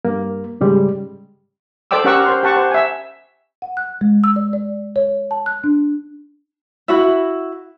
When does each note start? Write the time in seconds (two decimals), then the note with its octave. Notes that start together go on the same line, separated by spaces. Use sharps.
0.05 G2 A#3
0.61 G#2 C#3 G3 G#3
1.91 A4 C5 D5 G5 D6 E6
2.04 C#4 G4 A#4 F#5 C#6 E6
2.26 C5 C6
2.43 G4 F#5 A5 C#6
2.56 C5
2.71 E5 G#5
3.62 F#5
3.77 F#6
4.01 G#3
4.24 E6
4.36 D5
4.53 D5
4.96 C#5
5.31 A5
5.46 F#6
5.64 D4
6.88 E4 F#4 E5